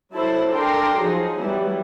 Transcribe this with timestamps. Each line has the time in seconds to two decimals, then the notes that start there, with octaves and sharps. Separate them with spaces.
0.14 F#3 E4 A4 C5 A5
0.51 D4 A4 A#4 G5 A#5 C6
1.00 F3 F#3 D#4 G#4
1.40 E3 F#3 G3 B3 E4